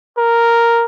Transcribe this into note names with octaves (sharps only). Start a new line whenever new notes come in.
A#4